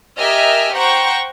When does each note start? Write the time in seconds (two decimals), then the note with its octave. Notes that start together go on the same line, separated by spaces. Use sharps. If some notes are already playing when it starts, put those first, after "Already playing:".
0.18 G4 A#4 D#5 E5 G#5 F6
0.74 C5 F#5 G5 A#5 C#6